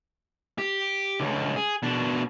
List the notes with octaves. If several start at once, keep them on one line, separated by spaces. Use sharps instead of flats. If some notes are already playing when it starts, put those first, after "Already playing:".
G4
C#2 D3
G#4
B2 D4